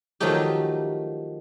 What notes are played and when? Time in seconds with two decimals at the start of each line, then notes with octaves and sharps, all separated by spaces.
0.20 D#3 F3 F#3 A3 D#4 G4